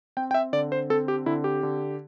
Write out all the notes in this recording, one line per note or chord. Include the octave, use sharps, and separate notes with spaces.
C4 G5
G5
E5
D3 D5
C5
C4 A4
G4
D3 E4
G4
D3